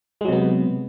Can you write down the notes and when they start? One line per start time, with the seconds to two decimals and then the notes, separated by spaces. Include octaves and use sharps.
0.21 G#3
0.25 F#3
0.29 C3
0.32 B3